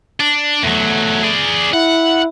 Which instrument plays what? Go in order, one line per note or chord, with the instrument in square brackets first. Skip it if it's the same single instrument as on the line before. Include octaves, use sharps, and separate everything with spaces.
[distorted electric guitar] D4
[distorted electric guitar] E2 F#3 [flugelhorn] A3
[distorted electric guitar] G#4 D5
[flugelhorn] E4 [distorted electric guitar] F#5